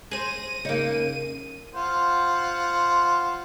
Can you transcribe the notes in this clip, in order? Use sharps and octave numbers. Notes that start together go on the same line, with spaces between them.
G#4 C5 A#6 D#7
C#3 A#3 D#4
F4 C5 F#5